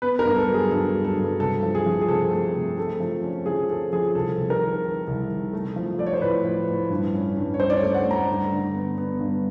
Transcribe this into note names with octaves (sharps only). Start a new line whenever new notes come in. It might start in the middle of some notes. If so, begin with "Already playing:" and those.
B3 B4
A#4
G2
A4
F#3
G#4
G2 A4
F#3
A4
G2
C3 A4
F3
G#4
F3
G#4
C3 A4
A3
C3
A3 A4
F3
C#4
F3 G#4
C#4 A4
F3 G#4
C2 A4
C3
A#4
D#3
D#3
C2
D#3
A3
F3
A3 D5
C#5
C5
A2 B4
F3
A2
G2
C#4
G2
C#5
C#4 C5
D5
C#5
A3
F#5
A3
A#5
G2
D3
B3
B3
G2